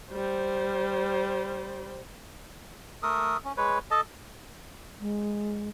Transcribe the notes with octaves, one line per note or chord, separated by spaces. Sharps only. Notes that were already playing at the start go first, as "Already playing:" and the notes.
G3 C5
A3 A4 A#4 D#6
C#4
G#3 B4 C#5
A4 D#5 A5
G#3